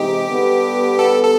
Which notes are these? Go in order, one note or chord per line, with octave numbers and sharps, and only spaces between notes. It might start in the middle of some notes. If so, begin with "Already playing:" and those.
Already playing: C3 E3 G#3 C4 D#4 G4
D3 G3 B3
A4
A4